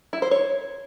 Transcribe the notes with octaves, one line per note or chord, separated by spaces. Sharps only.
E4
C5
C#5